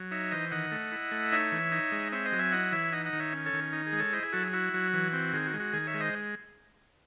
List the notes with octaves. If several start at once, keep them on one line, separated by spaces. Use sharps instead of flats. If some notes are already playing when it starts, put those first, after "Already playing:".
Already playing: F#3
D#4 C#5 E5
E3 C5 D#5
D#3 D#5 F#5
A3
E4
A3
D#4 C#5 E5
E3
D#4
G#3
C4 C#5 E5
C5 D#5
F#3
E5 G#5
E4 D#5 F#5
E3 C#5 E5
D#4 D#5 F#5
D#5 F#5
D#3
C#5 E5
C#4
A4 C#5
D#3
D#4
G#4
G#3
A4 C#5
E4 C5 D#5
G#4
F#3 F#4 A4
G#4
E4 F#4
F#3
E3
C4
D#3 G#4
F#4
G#3
F#4
D#3 G#4
C#5 E5
G#3
C5 D#5